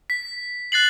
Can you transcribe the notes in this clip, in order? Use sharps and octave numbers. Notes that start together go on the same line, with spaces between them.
B6
F#6 A6 C7 F#7